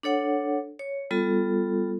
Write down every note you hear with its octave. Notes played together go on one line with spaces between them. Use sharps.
D4 A4 C#5 F#5
C#5
G3 B3 F4 A4